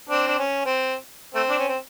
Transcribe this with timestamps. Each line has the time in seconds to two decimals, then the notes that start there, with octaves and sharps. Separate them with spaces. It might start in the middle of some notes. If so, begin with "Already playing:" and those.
0.09 C4 D4
0.28 D4
0.38 C#4
0.66 C4
1.35 A3 C4
1.49 D4
1.59 C#4
1.68 C4